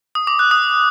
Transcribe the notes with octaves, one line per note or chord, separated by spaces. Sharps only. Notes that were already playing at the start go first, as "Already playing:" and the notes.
D#6
D6
F#6
D#6